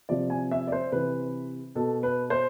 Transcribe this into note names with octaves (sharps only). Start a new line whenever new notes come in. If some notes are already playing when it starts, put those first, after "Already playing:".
C3 F3 D5
G#5
E5
D5
C5
C3 E3 B4
B2 A4
B4
C5